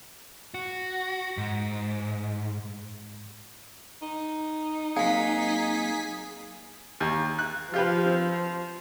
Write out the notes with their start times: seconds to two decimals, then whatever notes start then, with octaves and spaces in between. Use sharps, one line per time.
0.54 F#4
1.37 G#2
4.02 D#4
4.96 F#3 A#3 C4 G#4 F5 B6
7.00 D#2
7.39 F#6
7.74 F3 F4 G4 B4
8.05 C4